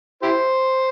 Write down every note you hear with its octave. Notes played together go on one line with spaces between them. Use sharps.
E4 G4 C5